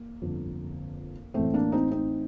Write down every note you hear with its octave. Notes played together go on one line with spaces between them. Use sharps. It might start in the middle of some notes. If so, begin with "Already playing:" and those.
Already playing: A#3
G1 F2 D3
A1 A2 A3 C4
A#3 D4
C4 D#4
C4 D#4